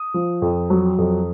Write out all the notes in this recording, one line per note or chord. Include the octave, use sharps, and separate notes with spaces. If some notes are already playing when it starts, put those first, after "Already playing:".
Already playing: D#6
F3
F2
F#3
F2